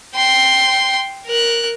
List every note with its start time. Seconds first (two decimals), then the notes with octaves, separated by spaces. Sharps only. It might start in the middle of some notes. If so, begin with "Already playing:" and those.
0.15 G5 C6
1.26 A#4 F#6